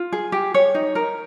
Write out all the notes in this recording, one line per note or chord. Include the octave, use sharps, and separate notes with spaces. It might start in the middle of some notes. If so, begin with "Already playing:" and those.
Already playing: F4
G#4
G4
C#5
D#4
A#4